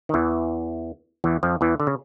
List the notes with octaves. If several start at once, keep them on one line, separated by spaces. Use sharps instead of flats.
D#3
E2 E3
E2 E3
F2 F3
E2 E3
D3
C#3